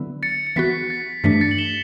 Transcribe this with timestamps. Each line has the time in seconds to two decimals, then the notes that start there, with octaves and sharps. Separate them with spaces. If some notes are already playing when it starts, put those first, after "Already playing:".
Already playing: D3 F#3 B3 E4
0.23 A6 C#7
0.47 C#7
0.56 E3 B3 F#4 B6
0.90 A6
1.24 G2 E3 A3 D4 B6
1.41 A6 C#7
1.51 F#7
1.58 E7 G7